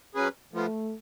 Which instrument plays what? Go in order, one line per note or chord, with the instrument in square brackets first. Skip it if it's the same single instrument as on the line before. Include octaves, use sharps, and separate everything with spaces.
[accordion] F#3 C#4 G#4 B4
[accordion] F3 B3 F4 [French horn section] A3